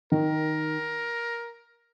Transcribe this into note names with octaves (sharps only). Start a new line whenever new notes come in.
D#3 A#4